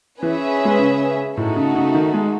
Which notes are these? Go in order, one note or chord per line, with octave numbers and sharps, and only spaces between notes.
E3 C#4 G#4 B4 E5
G#3
C#3
A2 A3 D#4 F#4 A4
C#3
C#3
D#3
G#3